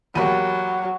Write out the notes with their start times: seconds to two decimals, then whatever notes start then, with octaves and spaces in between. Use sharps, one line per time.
0.15 E2 F#3 A#3 G4 B5 D#7